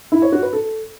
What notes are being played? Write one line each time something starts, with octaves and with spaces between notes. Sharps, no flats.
E4
C#5
F#4
B4
A4